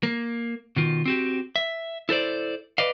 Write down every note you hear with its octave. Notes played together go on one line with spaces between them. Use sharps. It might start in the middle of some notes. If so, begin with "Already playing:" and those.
A#3
B2 D#3 F4
C4 F#4 G4
E5
E4 A4 C5 D5
B4 D5 D#5 F5